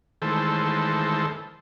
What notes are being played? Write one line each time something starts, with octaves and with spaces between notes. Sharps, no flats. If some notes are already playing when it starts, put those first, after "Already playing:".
D#3 E3 G#3 A3 A4 C5